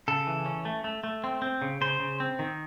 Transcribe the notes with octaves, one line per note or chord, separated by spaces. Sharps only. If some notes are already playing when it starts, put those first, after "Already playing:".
C#3 A4
E3
C#4
A3
A3
A3
C4
C4
C#3
C#3 C5
C#3
C4
D#3